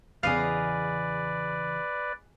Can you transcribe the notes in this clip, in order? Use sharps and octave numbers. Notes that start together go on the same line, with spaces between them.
E2 C#3 G#4 B4 D5 D#5 F5